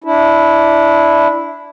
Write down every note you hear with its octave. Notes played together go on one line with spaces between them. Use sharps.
D4 E4